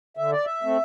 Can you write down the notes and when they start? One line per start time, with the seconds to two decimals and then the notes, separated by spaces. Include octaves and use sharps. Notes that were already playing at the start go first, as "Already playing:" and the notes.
0.17 D3 E5
0.32 D5
0.45 E5
0.62 A3 C4